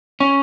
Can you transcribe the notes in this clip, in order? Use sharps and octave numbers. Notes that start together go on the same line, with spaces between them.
C#4